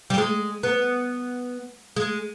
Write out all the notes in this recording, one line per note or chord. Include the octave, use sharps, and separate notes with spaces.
G3
G#3
B3
G#3